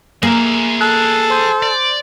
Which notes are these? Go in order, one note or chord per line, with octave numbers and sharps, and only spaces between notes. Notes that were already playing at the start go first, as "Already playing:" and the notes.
A#3 G#4 E5
A4 F#6
C5 C6 G6
D5